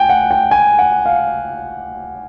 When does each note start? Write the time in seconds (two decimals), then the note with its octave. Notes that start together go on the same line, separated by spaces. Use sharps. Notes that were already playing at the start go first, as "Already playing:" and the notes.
Already playing: G5 G#5
0.09 F#5
0.31 G5
0.51 G#5
0.79 F#5
1.06 F5